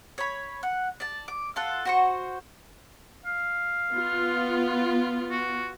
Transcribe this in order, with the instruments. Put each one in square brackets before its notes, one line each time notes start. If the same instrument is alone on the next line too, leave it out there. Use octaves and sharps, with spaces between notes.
[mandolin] C#5 B5
F#5
D5 A5
D6
F4 A4 F#5
F#4 C5 C#6
[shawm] F5
[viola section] B3 F4
[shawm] F#4